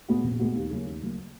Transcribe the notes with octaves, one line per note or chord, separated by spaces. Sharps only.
A#2 G#3 B3 F#4
A#1
A#2 G#3 B3 F#4
D#2
C#3 F#3 A#3
D#2
C#3 F#3 A#3